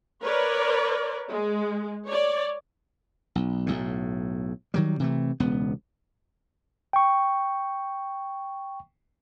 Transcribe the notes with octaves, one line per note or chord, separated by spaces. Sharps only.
A#4 B4 C#5 D5
G#3
C#5 D5
B1
B1 A2
D#3 F#3 G3
C3 E3 A3
E1 C#2 B3
G5 C#6